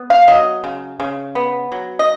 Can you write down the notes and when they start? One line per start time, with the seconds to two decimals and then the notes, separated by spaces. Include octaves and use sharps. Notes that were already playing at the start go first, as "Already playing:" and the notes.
Already playing: B3
0.10 F5
0.28 F#3 D#5
0.64 C#3
1.00 C#3
1.35 B3
1.72 F#3
1.99 D#5